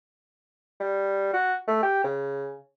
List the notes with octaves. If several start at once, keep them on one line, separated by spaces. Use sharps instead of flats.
G3
F#4
A3
G4
C#3